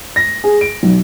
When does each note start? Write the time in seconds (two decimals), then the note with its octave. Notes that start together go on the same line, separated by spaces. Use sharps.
0.16 A#6
0.44 G#4
0.61 D7
0.83 B1